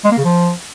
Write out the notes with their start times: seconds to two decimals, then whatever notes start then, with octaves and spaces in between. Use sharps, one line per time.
0.05 G#3
0.11 A#3
0.18 C#3
0.24 F3